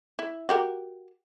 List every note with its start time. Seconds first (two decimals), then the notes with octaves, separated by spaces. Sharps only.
0.19 E4
0.49 F#4 G4 A#4